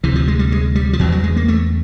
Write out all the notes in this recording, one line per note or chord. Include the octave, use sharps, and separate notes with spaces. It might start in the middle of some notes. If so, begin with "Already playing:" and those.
D2 C3 E3
F3
G#3
G3
G#3
G3
F3
E2 C#3 F#3
F#3
G#3
A#3
A3